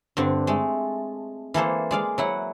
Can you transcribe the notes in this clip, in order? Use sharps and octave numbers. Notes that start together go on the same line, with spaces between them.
G2 D3 C4
G#3 A3
E3 A#3 A4 C5
G#3 D5 F5
F#3 E4 F#5